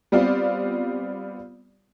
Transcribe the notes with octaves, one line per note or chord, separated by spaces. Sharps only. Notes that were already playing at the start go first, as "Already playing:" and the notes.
G3 B3 C4 F4 D5